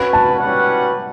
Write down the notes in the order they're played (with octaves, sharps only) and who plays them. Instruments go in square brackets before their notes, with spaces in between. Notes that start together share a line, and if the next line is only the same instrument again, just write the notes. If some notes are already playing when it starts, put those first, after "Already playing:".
Already playing: [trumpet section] C#4 F#4 B4
[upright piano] A5
[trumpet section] G3 C#4 F#4 B4 F#5